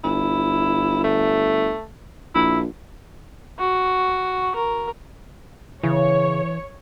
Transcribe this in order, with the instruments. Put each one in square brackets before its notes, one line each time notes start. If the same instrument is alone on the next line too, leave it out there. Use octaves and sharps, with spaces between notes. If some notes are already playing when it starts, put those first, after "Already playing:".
[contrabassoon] G1 [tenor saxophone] E4
[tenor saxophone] A3
[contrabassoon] A#1 [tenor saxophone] E4
[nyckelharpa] F#4
A#4
[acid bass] C#3 [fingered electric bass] E3 [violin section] C#5